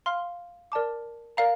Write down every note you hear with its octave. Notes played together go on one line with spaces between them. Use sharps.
F5 C6 F6
A#4 D5 A5 D6
A#4 D5 F5 A#5